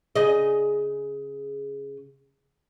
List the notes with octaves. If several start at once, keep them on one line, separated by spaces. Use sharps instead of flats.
C#3 G#4 D#5